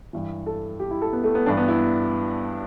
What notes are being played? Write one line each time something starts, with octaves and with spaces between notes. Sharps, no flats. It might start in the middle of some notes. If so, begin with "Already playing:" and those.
G2 E3
A4
G4
E4
A4
B3
A3
B3
G2 E3 D4
B3
E4